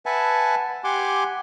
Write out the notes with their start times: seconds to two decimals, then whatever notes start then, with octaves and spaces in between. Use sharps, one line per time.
0.06 B4 E5 F#5 G#5 A5
0.84 G4 F#5 G#5 C6 D6